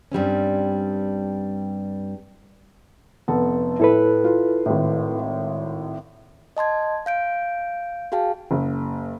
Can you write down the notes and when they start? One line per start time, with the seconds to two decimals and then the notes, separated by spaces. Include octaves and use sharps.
0.12 G2 G3 C4 C#4
3.28 F1 B3 A4
3.80 A2 E4 A4 B4
4.24 F4
4.66 G#1 A2
6.57 D#5 A5 C6 G#6
7.06 F5 G6 D7
8.12 F#4 G#4 F5 G5 A5
8.51 F#1